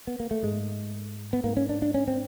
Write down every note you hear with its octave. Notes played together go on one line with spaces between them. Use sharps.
B3
A#3
A3
G#2 G#3
B3
G#2 A#3
C#4
D4
D4
C#4
C4